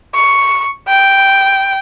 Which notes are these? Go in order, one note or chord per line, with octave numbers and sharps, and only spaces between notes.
C#6
G5